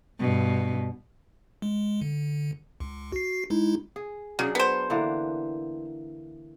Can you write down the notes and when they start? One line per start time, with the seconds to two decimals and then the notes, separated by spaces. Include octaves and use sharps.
0.20 G2 B2
1.62 G#3
2.01 D3
2.80 C#2
3.12 F#4 C7
3.50 G#3 D#4 E4
3.96 G#4
4.39 C#3 F#3 D4 G#4
4.55 B3 C5
4.90 D3 E3 A#3